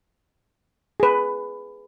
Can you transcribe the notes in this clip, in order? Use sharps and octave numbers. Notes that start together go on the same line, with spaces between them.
G#4 B4